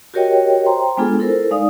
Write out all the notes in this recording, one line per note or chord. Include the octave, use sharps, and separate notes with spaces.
F#4 G4 A#4 C#5 D#5 G5
C5 G5 A#5 C6
G#3 B3 D4 F4 G#4 A4
E4 A4 A#4 C5
G#3 D#4 D5 F5 D#6